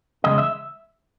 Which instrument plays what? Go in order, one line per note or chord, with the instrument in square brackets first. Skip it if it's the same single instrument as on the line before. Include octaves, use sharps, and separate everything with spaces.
[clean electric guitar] E2 C#3 G#3 D#5
E5